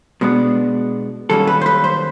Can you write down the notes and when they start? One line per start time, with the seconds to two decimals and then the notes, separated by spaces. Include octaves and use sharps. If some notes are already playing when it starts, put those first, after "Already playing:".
0.21 B2 G#3 B3 D4
1.30 F#2 D#3 G3 A#3 C#4 A4
1.47 B4
1.61 C5
1.66 B4
1.84 C5